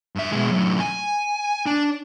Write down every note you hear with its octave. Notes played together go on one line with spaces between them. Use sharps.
G2 E5
B2 G#3
F#2 A2
G#5
D4